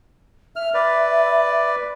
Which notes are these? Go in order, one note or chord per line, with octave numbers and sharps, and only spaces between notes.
E5 F6
B4 D5